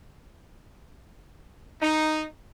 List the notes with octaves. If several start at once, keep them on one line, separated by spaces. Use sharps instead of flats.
D#4